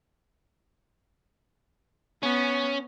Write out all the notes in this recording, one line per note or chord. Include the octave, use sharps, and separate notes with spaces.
B3 C#4